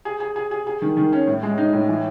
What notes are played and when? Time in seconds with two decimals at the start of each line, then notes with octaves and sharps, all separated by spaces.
0.05 G#4
0.20 G#4
0.36 G#4
0.51 G#4
0.67 G#4
0.82 D#3
0.97 D#3
1.12 C#4
1.27 A2
1.43 G#3
1.58 D#4
1.73 A2
1.89 E3